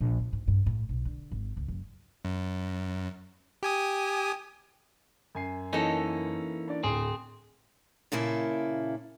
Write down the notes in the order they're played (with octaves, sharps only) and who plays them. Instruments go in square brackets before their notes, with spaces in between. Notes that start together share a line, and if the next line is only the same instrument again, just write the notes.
[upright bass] A#1
A#2
G#2
G2
A2
B1
D3
G#1
C#2
F#1
[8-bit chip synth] F#2
G4 G#5 D#6
[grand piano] F#2 G#5 C7
[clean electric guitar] E3 A#3 C#4 [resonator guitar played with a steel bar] D#4 A4
[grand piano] D4 D5
[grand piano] D1 [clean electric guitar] C4 G#4
[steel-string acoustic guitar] A#2 C#3 A#3 E4 A4